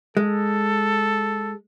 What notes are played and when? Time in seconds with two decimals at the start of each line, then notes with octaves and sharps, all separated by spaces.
0.17 G#3 A4